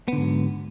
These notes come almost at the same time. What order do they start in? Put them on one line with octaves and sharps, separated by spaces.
B3 D3 G#2 F#3